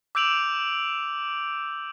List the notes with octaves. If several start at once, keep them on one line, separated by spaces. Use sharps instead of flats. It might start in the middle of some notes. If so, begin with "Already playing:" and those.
D6 E6 G6 D7 F7 F#7